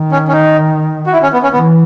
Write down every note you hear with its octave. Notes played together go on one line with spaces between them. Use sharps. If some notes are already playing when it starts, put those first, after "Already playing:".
Already playing: D#3
C#4
C#4
D#4
F#4
E4
C#4
B3
C#4
E3 B3